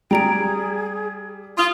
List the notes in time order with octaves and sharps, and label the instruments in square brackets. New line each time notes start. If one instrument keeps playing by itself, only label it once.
[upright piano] G3 [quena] G#4 [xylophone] G5 A#5 D7
[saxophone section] F4 [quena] D#6